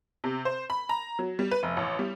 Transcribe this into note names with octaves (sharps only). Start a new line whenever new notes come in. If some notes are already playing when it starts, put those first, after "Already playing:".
C3
C5
B5
A#5
F#3
G3
B4
F1
A1
G3